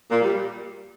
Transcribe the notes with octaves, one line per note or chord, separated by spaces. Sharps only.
A#2
G3
G3